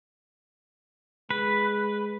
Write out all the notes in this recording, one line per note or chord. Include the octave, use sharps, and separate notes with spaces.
G#3 B4